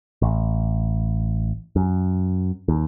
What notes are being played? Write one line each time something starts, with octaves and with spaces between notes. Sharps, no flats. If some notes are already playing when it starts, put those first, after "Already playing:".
A1
F#2
D#2